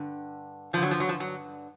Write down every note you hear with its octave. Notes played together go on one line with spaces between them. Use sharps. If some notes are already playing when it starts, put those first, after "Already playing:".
Already playing: G2 D3
G2 D3 F3
F#3
F3
F#3
F3
F#3